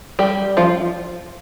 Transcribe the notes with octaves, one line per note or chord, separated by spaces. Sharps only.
G3 G4
F3 F4